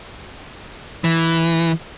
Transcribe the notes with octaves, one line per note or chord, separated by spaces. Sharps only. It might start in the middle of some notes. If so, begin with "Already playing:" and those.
E3